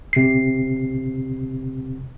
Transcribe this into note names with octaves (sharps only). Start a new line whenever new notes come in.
C3 C7